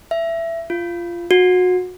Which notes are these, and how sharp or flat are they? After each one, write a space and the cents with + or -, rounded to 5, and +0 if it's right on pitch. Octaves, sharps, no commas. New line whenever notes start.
E5 +15
F4 -15
F#4 -25